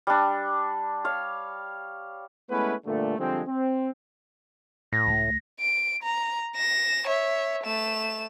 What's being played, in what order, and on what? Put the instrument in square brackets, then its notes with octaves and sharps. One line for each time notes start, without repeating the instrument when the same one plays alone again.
[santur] G3 D4
C#5 F5
[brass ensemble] G#3 A3 B3 C#4 E4 B4
G2 A#2 D3 A3
D3 F3 G3 G#3 C4
C4
[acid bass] A2 [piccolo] A#6
[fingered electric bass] C#2 G#3 A3
[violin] D7
A#5
A#6 E7
C#5 E5
A3 E7